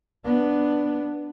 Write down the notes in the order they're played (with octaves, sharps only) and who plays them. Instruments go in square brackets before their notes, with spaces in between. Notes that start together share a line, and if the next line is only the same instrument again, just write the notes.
[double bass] B3 D4